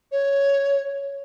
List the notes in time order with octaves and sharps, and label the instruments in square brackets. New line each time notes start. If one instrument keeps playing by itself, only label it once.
[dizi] C#5